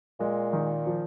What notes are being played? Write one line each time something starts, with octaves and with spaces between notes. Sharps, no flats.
A#2 G#3
D#3
F3